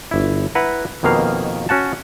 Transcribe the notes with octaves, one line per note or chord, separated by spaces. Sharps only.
G1 E4
E4 B4 F#5 A#5
F2 B2 D#3 A#3 F5
C#4 F#4 F#5 A5